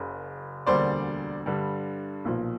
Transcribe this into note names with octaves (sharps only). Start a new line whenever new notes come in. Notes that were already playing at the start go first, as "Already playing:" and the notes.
Already playing: F#1 F#2 C#3
E1 D2 D3 G3 A#3 C5 D5
G2 D3 G3
B1 A#2 F3